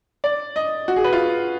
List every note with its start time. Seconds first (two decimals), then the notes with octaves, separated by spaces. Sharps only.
0.24 D5
0.56 D#5
0.88 F#4
0.96 G#4
1.04 B4
1.13 F4